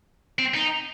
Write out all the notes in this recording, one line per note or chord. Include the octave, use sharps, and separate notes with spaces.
C4
D#4